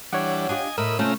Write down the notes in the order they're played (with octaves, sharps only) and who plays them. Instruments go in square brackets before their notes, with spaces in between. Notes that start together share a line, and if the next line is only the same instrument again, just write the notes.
[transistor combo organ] E3 G3 D4 [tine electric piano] C#5 F#5
[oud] D4 F4 G4 [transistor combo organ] D#5 G#5
[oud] A2 [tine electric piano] A#4 [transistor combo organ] D#5 E5 B5
[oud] C3 A3 [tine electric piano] C#4 [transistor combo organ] F4 E5 A#5